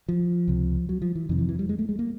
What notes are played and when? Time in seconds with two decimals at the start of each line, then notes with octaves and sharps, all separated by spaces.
0.08 F3
0.48 C#2 C3
0.89 F#3
1.02 F3
1.16 E3
1.29 F2 C3 D#3
1.39 E3
1.49 E3
1.59 G3
1.69 G#3
1.79 A3
1.89 G#3
1.99 A#3